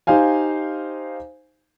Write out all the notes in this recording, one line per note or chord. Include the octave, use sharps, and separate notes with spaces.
D#4 G4 C5 F5 G#5